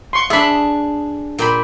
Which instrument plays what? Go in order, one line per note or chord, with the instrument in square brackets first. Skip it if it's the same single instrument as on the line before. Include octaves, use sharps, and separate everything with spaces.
[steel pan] C6 C#6
[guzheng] D4 G#4 [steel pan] E5 B5
[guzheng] A#2 G5 B5